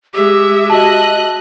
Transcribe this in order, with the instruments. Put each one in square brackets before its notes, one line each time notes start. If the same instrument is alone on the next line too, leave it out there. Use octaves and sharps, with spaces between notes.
[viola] G#3 E5 [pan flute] G4
[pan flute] F#4 [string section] D#5 F#6 [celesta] A5